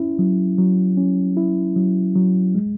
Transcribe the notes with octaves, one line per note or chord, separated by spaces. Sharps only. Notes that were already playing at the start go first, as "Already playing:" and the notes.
Already playing: C#4 E4
F#3
F#3
C#4
E4
F#3
F#3
G#3